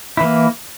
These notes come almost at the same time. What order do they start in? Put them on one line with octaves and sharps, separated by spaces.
E4 E3 A#3